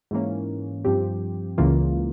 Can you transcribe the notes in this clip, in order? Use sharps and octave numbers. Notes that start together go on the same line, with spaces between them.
G#2 E3 A#3 C#4
G2 F3 C4 G4
C#2 C#3 E3 A#3 F4